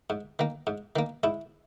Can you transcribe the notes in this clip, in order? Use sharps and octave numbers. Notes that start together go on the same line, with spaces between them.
G#2
D#3 A#3
G#2
D#3 A#3
G#2 E4